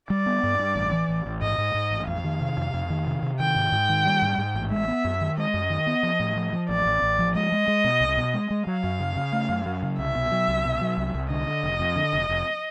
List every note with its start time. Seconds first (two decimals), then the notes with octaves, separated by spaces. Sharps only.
0.10 G3 D5
0.26 B3
0.43 G2
0.59 G2
0.76 A1
0.92 E3
1.09 A1
1.26 A1
1.42 G#2 D#5
1.58 G#2
1.74 G#2
1.91 A1
2.07 F2 F5
2.24 D#3
2.41 C3
2.57 F2
2.74 F2
2.90 D#3
3.06 C3
3.23 C3
3.40 D#3 G5
3.56 G#2
3.72 G#2
3.89 D#3
4.05 G3
4.22 G#2
4.38 G#2
4.55 A1
4.71 G#3 E5
4.88 B3
5.05 F#2
5.21 D#3
5.38 G#3 D#5
5.54 F#2
5.70 D#3
5.87 B3
6.03 F3
6.20 A2
6.36 F3
6.53 F3
6.69 A1 D5
6.86 A1
7.02 A1
7.19 F3
7.35 G#3 D#5
7.52 G#3
7.68 G#3
7.84 B2
8.01 C2
8.18 B2
8.34 G#3
8.50 G#3
8.66 F#3 F5
8.84 F#2
9.00 C#3
9.16 C#3
9.32 A3
9.49 F#2
9.66 F#3
9.83 C#3
9.99 C2 E5
10.15 B2
10.32 F#3
10.48 C2
10.65 B2
10.81 F#3
10.98 C2
11.14 C2
11.30 D3 D#5
11.47 D3
11.64 F1
11.80 F2
11.96 D3
12.13 F1
12.29 F1